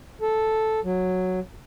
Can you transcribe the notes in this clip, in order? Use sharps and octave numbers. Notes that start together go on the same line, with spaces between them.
A4
F#3